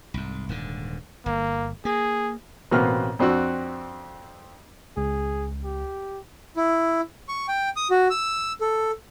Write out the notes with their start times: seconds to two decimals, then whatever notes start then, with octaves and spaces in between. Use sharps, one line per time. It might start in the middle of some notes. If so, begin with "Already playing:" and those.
0.14 C2 G#2
0.49 D#1 G#2 D3
1.26 G1 A#3
1.85 A#3 G#4
2.71 A1 B2 A#3 C4 B4 F6
3.19 F2 C4 D4 F#4 E6 F#6
4.97 C#2 G#4
5.64 G4
6.57 E4
7.29 C#6
7.48 G5
7.76 D#6
7.91 F#4
8.10 E6
8.61 A4